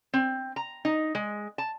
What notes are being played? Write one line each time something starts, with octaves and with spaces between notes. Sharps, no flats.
C4
A#5
D#4
G#3
A5